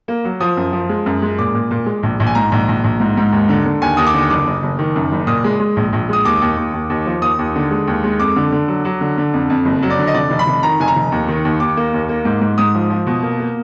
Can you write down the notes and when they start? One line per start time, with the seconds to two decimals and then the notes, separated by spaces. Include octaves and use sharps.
0.08 A#3
0.25 F#3
0.40 F3 D#6
0.57 F#2
0.73 F3
0.89 G#3
1.06 F#2
1.22 G#3
1.38 A#2 D6
1.54 A#2
1.71 A#2
1.86 G#3
2.03 A#1
2.20 A#1
2.27 G#5
2.35 G#2 A#5
2.52 A#1
2.68 A#1
2.84 A#1
3.00 G#2
3.17 G#2
3.32 D#2
3.49 D3
3.66 D3
3.81 D#2 G#5
3.97 D#2 D#6
4.06 D6
4.14 D3
4.30 F#1 D6
4.46 F#1
4.63 F#1
4.79 D#3
4.96 F#2
5.12 F#1
5.27 A#2 D#6
5.44 G#3
5.60 G#3
5.77 A#1
5.93 A#1
6.09 G#3 D#6
6.25 D#2 D6
6.42 D#2
6.57 D#2
6.74 D#2
6.90 D#2
7.06 F3
7.22 D#2 D#6
7.39 D#2
7.55 D3
7.71 G#3
7.87 D#2
8.04 G#3
8.20 F2 D6
8.36 D3
8.52 D3
8.68 F#3
8.85 F#3
9.01 D3
9.18 D3
9.33 F2
9.50 F2
9.65 F#1
9.83 F#3
9.90 D5
9.99 D3
10.07 D#5
10.14 F1 D5
10.30 F1
10.39 B5
10.47 F1
10.63 D#3 A#5
10.80 F1 G#5
10.88 A#5
10.96 F1
11.12 D#2
11.28 D#3
11.45 D#2
11.60 D#2 D6
11.77 A#3
11.94 D#2
12.09 A#3
12.25 G#2
12.41 G#2
12.58 G#2 D#6
12.75 F3
12.90 F3
13.07 B2
13.23 A#3
13.40 A#3